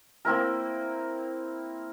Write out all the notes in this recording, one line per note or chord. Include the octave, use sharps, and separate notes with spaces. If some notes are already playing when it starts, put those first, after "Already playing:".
A#3 C4 E4 A#4